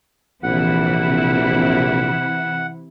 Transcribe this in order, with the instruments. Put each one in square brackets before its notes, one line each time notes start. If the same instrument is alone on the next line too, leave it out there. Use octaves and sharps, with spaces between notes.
[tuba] A#1 [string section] C3 E3 E4 [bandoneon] F#5